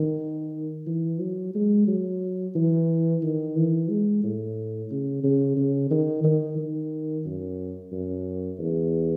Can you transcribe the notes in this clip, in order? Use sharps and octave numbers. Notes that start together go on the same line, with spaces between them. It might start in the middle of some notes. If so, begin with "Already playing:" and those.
Already playing: D#3
E3
F#3
G#3
F#3
E3
D#3
E3
G#3
A2
C#3
C#3
C#3
D#3
D#3
D#3
F#2
F#2
E2